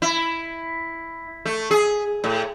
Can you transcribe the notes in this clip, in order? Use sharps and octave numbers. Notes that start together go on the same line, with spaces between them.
E4
A3
G#4
A2